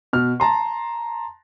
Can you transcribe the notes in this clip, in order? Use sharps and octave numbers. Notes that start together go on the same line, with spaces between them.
B2 F6
A5 A#5 C6